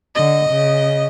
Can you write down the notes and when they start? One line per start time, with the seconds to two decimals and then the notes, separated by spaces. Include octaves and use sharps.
0.15 D3 D#5
0.49 C#3